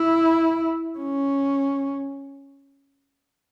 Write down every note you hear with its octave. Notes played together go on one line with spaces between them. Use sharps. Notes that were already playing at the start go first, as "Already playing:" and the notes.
Already playing: E4
C#4